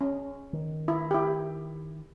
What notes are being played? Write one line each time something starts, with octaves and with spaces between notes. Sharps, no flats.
C#4
D#3
E4
E4 G4